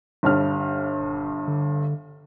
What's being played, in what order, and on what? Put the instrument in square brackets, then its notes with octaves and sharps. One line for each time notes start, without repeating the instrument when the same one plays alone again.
[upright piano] G1 G2 F6
[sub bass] D#1
D3